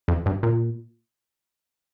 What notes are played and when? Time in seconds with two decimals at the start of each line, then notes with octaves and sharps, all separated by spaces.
0.08 F2
0.26 G2
0.43 A#2